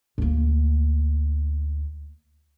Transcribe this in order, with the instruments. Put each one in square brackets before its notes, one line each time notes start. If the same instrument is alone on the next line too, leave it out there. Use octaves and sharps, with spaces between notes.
[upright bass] D2 A#3